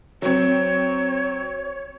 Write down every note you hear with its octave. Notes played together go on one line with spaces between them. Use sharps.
F#3 C4 C#5